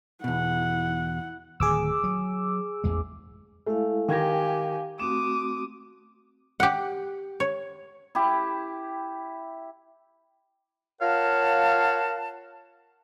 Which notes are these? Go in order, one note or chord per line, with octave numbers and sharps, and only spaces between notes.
E2 B2 E4 F#5
D1 D#3 G#4 D6 E6
F#3
A1 E2 G#3
G#3 A3 E4 F5
D#3 G4 F5 G#5 G#6 A#6
A3 C4 F#4 D6 D#6 E7
G4 F#5
C#5
E4 G4
F4 A#4 C#5 F5 F#5 A5